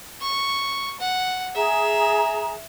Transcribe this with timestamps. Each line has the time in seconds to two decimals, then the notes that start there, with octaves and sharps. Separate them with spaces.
0.21 C#6
1.00 F#5
1.55 G#4 E5 A#5